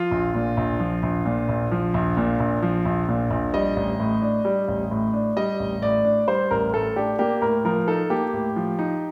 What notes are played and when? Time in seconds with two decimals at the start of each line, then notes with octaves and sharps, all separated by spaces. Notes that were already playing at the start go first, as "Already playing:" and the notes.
Already playing: F3 F4
0.11 A#1
0.35 A#2
0.57 A#1
0.80 F3
1.03 A#1
1.25 A#2
1.49 A#1
1.71 F3
1.94 A#1
2.17 A#2
2.40 A#1
2.62 F3
2.85 A#1
3.09 A#2
3.31 A#1
3.54 G3 D#5
3.76 A1
4.00 A2
4.22 D4
4.45 G3
4.68 A1
4.91 A2
5.14 D4
5.37 G3 D#5
5.59 A1
5.82 A2 D5
6.05 D4
6.27 G3 C5
6.51 A1 A#4
6.73 A2 A4
6.96 D4 G4
7.19 A#3 G4
7.42 A2 A#4
7.65 F3 A#4
7.88 D#4 A4
8.10 A#3 G4
8.33 A2
8.56 F3
8.79 D#4